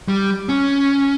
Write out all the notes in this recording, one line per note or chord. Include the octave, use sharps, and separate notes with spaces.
G3
C#4